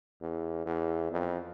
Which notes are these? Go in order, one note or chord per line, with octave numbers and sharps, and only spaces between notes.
E2
E2
F2